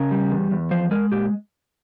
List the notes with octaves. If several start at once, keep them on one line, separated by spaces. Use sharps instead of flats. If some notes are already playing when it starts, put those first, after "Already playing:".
Already playing: C#3 A#4
G3
E2
E2
F3 C5
G#3 A#4
A#2 G4